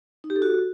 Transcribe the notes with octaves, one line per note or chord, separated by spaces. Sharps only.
D#4
G4
A4
F#4